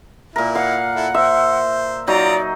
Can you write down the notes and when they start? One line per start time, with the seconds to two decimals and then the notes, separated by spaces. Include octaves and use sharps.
0.36 A#2 E4 A#4
0.55 F5 F#5
0.96 E4 A4
1.14 C5 E5
2.07 F#3 D#4 F4 D5 A#5